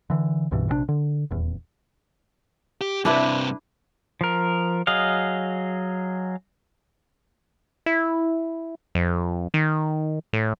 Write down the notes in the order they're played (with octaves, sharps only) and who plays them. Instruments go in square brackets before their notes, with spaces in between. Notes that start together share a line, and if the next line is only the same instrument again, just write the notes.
[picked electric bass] D3 E3
C2 G2 B2 E3
A#1 C3 F3 D4
D3
D#1 E2
[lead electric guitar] G4
[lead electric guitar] G2 C3 [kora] D4 E4 B4
[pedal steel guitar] F3 A#4
F#3 G#4 D#5 F5
[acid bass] E4
F2
D#3
A2